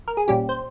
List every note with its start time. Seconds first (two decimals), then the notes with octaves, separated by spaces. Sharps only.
0.08 A#4
0.17 G#4
0.28 A#2 G3 C#4 G4
0.49 C5